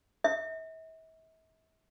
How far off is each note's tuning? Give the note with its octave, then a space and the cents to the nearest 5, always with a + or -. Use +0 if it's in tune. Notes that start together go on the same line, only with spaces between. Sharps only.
E5 -40